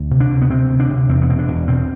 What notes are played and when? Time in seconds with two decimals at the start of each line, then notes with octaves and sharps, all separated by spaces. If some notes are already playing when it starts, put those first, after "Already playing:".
Already playing: D2
0.11 C3
0.20 D4
0.30 D2
0.42 B3
0.50 C3 C4
0.69 D2
0.80 D4
0.89 C3
1.09 E2 C4
1.22 B3
1.29 B2 C4
1.39 D4
1.48 E2
1.68 B2 C4